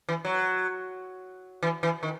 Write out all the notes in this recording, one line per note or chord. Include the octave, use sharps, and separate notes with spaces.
E3
F#3
E3
E3
D#3